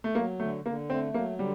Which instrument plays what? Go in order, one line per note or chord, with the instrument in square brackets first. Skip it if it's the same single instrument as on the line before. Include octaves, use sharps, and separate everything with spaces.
[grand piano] A3
[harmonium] F#3 [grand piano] A#3
[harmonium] D3 [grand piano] A3
[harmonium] D3 [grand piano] A#3
[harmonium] A3 [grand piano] C4
[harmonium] F#3 [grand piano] A#3
[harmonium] D3 [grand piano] G3